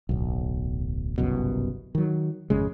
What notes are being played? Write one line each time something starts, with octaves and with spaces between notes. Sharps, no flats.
D1 B1
G1 C2 F#2 B2
D#3 F#3
G#1 F2 C#3 G#3